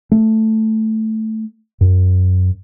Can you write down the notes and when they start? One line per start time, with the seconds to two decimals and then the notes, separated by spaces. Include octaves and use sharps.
0.12 A3
1.81 F#2